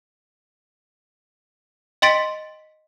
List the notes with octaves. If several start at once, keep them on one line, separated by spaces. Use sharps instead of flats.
D#5 G5 C6 A6 B6 D7